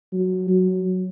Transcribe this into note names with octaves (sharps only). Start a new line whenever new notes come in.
F#3
F#3